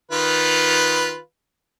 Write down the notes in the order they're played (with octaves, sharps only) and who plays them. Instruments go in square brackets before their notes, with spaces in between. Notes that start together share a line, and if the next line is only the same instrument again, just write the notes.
[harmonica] D#3 F4 B4